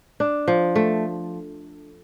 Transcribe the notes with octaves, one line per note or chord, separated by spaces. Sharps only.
D4
F3
A3